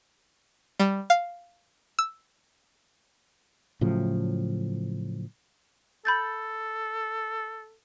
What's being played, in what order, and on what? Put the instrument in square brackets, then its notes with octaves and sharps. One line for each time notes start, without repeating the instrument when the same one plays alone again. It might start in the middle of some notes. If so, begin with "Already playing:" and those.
[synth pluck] G3
F5
E6
[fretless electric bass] A2 C#3 F3 F#3
[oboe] A4 [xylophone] B5 G6 A6